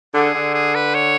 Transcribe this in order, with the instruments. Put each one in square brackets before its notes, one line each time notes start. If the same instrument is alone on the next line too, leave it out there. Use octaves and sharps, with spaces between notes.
[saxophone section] D3 [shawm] G#4
[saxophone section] D3
[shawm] G#4
B4
C#5